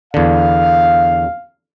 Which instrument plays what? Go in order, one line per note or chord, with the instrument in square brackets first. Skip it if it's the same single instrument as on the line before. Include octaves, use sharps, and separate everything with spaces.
[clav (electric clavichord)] E2 D3 [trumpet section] F5